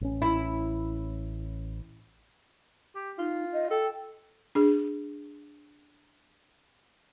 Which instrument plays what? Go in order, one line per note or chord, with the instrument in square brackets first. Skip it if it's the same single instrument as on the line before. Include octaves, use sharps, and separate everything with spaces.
[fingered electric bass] A1 C#4
[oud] E4
[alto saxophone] G4
[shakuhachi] D#4 [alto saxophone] F4
[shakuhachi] D#5
[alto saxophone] A4 [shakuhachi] G5
[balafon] D4 G#4